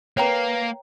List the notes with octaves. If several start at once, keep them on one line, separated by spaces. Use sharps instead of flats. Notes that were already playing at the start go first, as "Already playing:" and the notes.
A#3 B4 C#5 G5 A#5 C7